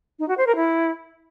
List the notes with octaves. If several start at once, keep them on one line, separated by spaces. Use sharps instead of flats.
D#4
F#4
C5
A#4
E4